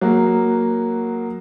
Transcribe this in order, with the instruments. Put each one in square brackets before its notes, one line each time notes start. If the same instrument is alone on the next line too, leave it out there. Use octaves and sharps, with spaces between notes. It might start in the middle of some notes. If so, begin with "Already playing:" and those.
[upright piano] F#3 A#3 F#4 G#4